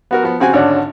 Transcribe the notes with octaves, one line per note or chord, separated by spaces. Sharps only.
B3 F#4 A#4
F3 B3
C#3 C4 F#4 G#5
G#1 D3 C#4 D4 F#6